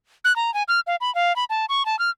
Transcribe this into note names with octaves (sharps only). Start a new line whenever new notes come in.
F#6
A#5
G#5
F6
F5
B5
F5
B5
A5
C#6
A5
F6